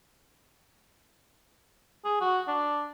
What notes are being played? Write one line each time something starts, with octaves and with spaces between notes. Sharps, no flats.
G#4
F#4
D4